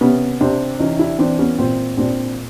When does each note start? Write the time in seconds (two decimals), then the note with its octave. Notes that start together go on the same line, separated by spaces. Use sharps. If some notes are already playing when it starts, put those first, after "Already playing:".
0.01 C3 B3 C#4
0.40 C3 C4 D4
0.79 E3 C#4 D#4
0.99 D4 E4
1.19 E3 C4 D4
1.39 B3 C#4
1.59 A#2 C4
1.97 A#2 C4 D4